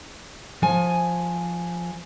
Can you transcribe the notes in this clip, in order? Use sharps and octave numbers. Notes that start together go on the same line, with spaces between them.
F3 G#5